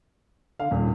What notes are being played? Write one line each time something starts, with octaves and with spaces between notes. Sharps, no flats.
D3 F5
D#1 A#2